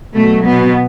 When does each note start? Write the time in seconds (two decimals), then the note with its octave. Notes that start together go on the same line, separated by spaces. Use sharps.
0.14 B2 F#3 A3
0.46 B2 B3